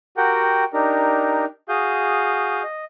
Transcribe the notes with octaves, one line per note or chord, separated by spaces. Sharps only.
F#4 G4 A#4 F#5 G5
D4 D#4 G4 A#4
F#4 G#4 F5 D#6 G6
D#5